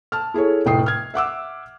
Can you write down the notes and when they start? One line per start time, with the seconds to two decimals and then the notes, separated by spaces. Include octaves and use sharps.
0.12 A5 F6
0.34 E4 G#4 A4 C#5
0.66 F1 A2 G5 D#6 C7
0.86 F6 G#6
1.14 E5 F#5 D6 E6